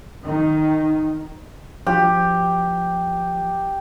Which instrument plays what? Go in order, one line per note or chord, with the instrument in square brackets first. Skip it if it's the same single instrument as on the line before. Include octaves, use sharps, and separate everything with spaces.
[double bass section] D#3
[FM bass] F3 [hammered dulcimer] G4